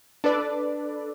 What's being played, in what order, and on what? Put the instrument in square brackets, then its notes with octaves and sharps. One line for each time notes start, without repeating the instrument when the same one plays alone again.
[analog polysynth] D4 A4 B4 D5